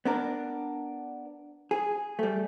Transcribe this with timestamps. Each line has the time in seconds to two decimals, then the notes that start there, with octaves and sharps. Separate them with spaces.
0.05 B3 D4 A#4
1.71 G#4
2.19 G3 A3